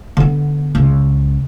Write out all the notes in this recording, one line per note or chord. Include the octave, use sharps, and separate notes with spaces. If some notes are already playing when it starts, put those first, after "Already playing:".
D3 B3
C#2